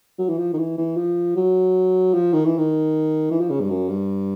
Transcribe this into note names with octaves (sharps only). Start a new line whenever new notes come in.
F#3
E3
F3
D#3
E3
E3
F3
F#3
F3
D#3
E3
D#3
E3
F3
C#3
G2
F#2
G2